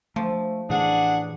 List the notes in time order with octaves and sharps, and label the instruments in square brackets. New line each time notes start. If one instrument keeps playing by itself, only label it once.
[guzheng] F3 [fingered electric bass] A3
[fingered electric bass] A2 E3 [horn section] D4 G#4 F#5